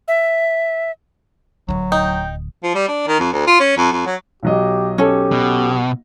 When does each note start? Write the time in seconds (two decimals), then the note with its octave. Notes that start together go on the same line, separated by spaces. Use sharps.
0.08 E5
1.69 D1 G1 D2 F#3
1.92 D#4 G5
2.63 F3
2.75 G3
2.88 D4
3.07 D#3
3.20 F2
3.32 D2
3.47 F4
3.60 C#4
3.77 F2
3.92 F2
4.06 F#3
4.43 B1 F#3 G4 D#5
4.98 C#4 G4 A4
5.32 B2